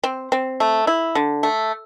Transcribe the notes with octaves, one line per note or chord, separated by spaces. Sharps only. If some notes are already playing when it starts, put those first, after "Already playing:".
C4
C4
A3
E4
D3
A3